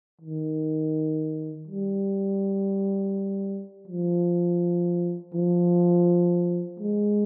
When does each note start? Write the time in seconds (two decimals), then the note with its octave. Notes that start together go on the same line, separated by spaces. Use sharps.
0.21 D#3
1.68 G3
3.88 F3
5.34 F3
6.80 G#3